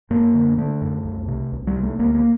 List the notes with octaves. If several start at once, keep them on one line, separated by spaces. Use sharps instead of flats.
F#2 A#3
D3
D3 A3
F#2
C2
C3
C2
G3
C3
A3
D2 A#3
A#3